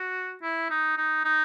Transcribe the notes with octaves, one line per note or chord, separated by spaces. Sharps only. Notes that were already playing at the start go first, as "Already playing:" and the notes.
Already playing: F#4
E4
D#4
D#4
D#4